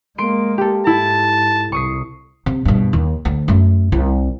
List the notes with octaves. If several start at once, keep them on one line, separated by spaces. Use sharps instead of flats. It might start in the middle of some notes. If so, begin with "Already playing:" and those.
G#3 A#3 C6 D7
G4 A4
G#2 E4 A5
C2 C3 C#6 D#6 C7
C3
G2 B2
D#2
D2
F#2 A3
C2